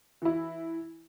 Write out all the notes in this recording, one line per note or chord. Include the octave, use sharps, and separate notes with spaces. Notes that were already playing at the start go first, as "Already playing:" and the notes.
E3 E4